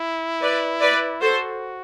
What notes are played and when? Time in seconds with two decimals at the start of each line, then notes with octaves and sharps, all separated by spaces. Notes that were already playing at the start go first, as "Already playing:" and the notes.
Already playing: E4
0.42 B4 D5
0.81 B4 D5
1.21 F#4 A4 C5